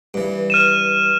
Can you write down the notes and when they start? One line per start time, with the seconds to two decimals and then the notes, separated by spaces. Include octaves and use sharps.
0.14 G2 E3
0.50 F6 D#7 E7